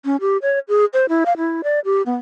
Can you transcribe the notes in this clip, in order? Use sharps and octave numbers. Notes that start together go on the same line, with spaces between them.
C#4
G4
C#5
G#4
C5
E4
F5
E4
D5
G4
B3